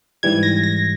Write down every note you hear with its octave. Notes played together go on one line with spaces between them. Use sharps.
G#2 E3 G3 G#6
A#6
A#6